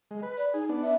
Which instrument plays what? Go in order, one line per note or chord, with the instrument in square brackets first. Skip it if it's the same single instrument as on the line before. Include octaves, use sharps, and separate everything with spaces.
[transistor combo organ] G#3
B4
[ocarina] D5
[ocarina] D#4 [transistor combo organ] G#4
[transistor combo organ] B3 D4
[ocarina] E5